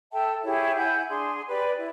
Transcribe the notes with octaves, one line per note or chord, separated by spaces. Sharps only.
A4 E5 G5 A5
E4 G4 G#4 C#5
E4 F#5 G#5 G6
D4 G#4 C6
G4 B4 D5
E4